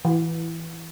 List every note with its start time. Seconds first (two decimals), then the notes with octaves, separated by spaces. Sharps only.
0.05 E3